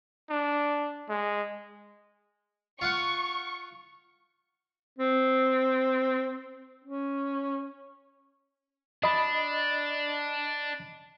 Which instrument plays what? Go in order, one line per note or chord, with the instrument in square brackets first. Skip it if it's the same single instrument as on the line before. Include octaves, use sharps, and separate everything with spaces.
[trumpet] D4
G#3
[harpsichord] F4 F5 F#5 [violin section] C#6
[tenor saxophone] C4
C#4
[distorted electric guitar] D4 [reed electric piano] D#5 B5